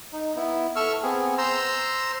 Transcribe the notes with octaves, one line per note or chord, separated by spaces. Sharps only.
D#4
B3 E4
A4 E5 C#6 E6 F6
B3 C4 G#4
C5 A#5 C6 E6